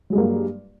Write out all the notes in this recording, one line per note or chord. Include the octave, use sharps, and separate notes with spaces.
G2 F#3 G#3 A#3